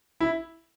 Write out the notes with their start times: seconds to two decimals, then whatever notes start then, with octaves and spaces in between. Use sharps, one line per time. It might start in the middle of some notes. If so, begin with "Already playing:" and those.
0.20 E4